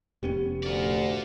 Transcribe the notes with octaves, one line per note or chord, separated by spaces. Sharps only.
F1 B3 C#4 G4
D2 F4 D5